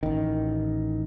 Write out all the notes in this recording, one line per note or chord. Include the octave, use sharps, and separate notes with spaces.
A1 D#3